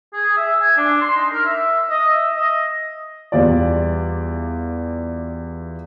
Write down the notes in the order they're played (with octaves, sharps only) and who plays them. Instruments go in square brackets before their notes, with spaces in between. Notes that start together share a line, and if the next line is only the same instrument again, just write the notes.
[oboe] G#4
E5
G#5
D4
C6
D#4
A#4
E5
D#5
E5
D#5
[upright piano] E2 G3 F4 D5